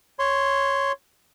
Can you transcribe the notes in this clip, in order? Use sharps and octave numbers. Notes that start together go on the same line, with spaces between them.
C#5 C6